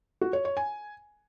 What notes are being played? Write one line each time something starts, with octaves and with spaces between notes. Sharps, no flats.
F#4
C#5
C#5
G#5